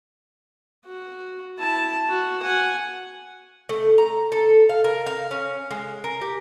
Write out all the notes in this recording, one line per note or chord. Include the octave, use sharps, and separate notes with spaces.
F#4
E4 A5
F#4
F#5 G#5
A3
A#5
A4
F5
A#4
F5
C#4
G#3
A#4
G4